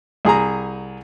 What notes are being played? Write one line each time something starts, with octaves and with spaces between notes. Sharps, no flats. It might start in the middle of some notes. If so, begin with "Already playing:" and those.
C2 G#4 G#5 A#5